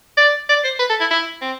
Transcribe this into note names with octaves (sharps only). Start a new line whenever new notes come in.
D5
D5
C5
B4
A4
E4
E4
C4